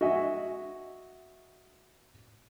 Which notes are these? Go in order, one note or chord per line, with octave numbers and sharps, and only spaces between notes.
F#4 D#5 E5 G#5